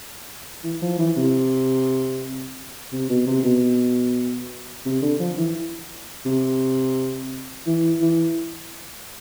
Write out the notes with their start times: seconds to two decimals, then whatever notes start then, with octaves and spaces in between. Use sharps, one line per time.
0.64 E3
0.82 F3
0.99 E3
1.17 C3
2.93 C3
3.10 B2
3.27 C3
3.44 B2
4.85 C3
5.02 D3
5.20 F3
5.38 E3
6.26 C3
7.67 E3
8.01 E3